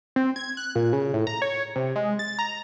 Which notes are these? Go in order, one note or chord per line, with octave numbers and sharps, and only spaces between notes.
C4
G#6
F#6
A#2
C#3
A2
A#5
C#5
C3
G#3
A6
A#5